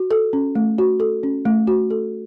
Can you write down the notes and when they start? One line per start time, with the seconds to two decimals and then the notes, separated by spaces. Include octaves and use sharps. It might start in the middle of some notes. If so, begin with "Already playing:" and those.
Already playing: F#4
0.11 A4
0.33 C#4
0.55 A3
0.78 F#4
1.00 A4
1.23 C#4
1.45 A3
1.67 F#4
1.91 A4